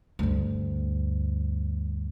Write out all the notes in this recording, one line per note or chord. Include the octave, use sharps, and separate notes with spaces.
D2 G2